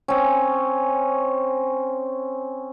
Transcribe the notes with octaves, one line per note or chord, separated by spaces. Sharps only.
C4 C#4